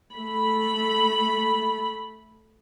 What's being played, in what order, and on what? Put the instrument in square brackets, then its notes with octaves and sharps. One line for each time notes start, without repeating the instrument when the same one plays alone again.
[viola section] A3 B5